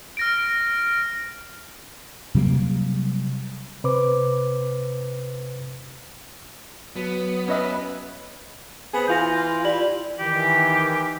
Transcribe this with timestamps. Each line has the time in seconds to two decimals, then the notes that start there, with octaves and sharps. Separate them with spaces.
0.17 F6 A#6 D7
2.34 C3 F#3 G3 A#3
3.84 C3 B4 C5 D6
6.96 F#3 B3
7.48 C#4 B4 D#5 E5 D#6
8.94 B3 C4 G#4
9.08 E3 F4 G6 A#6
9.64 E4 F4 G4 D5 F#7
10.19 D#3 E3 G4